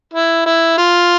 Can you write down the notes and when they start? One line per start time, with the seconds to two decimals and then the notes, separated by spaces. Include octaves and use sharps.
0.13 E4
0.46 E4
0.78 F4